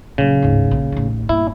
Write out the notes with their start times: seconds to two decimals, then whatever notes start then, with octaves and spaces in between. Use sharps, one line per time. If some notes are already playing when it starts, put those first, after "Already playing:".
0.18 A#2 C#3 F#3
0.42 D1 G#2
0.71 A#1
0.92 A1 D#2
1.29 G1 A#2 E4